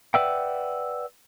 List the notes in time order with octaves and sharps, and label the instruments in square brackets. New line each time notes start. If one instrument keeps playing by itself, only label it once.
[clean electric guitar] B4 D5 E5 F#5 G5